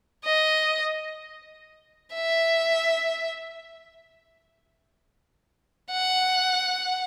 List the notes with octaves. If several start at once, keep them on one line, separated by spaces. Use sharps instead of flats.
D#5
E5
F#5